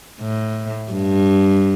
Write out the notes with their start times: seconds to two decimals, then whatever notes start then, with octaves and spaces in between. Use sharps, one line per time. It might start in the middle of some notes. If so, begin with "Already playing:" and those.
0.21 A2
0.91 G2